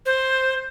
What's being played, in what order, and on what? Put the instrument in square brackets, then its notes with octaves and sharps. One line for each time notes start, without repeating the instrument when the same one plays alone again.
[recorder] C5